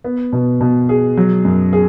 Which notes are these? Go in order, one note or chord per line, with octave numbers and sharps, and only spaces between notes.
B3
B2
B2
G#4
F#3
F#2
G#4